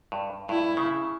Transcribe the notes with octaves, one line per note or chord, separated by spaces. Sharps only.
G2
G2 E4
C#3